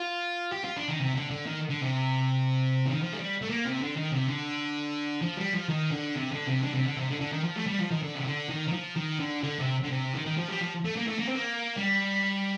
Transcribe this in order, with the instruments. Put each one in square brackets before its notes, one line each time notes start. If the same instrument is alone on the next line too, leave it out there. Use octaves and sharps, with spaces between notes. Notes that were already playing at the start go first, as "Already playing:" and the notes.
Already playing: [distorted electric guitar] F4
G4
F4
D4
D#3
C3
D3
D3
D#3
D3
C3
D#3
F3
A3
G3
A3
A#3
C3
D3
D#3
C3
D3
F3
G3
F3
D#3
D3
C3
D3
C3
D3
C3
D3
C3
D3
D3
D#3
F3
A3
G3
F3
D#3
D3
C3
D3
D#3
D#3
F3
D#3
D3
D3
C3
D3
C3
D#3
D#3
F3
G3
F3
A3
A#3
A3
A#3
C4
A#3
G3